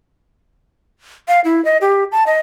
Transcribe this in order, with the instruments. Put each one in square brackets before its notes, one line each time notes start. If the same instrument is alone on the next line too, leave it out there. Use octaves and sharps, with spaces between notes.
[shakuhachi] F5
E4
D#5
G4
A5
D#5